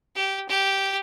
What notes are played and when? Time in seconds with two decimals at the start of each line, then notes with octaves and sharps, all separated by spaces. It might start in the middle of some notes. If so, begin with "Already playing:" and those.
0.16 G4
0.49 G4